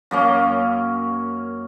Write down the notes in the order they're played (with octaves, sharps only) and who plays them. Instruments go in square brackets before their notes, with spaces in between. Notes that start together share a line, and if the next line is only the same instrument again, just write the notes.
[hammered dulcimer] F#2 A#3 C#4